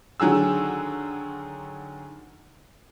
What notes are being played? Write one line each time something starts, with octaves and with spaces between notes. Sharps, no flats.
D3 D#3 F#3 G#4 E6